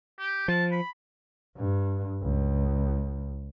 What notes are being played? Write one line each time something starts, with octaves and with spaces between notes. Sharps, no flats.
G4
F3 A5
B5
G2
C#2